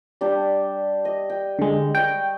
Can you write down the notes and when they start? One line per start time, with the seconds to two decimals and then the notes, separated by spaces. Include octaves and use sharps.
0.21 G3 D4 G5
1.05 D#5
1.30 G5
1.59 D3 G#3
1.95 D#5 G5 B5 C#6